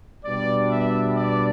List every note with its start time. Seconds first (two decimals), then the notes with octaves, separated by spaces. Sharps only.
0.24 B2 G3 B3 D4 D5
0.71 E5
1.17 D5